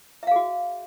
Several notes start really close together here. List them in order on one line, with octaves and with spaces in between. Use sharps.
E5 F5 G#4 F#4